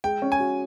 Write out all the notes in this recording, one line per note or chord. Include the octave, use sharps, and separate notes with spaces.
G#3 G5
C#4
G#5
F#4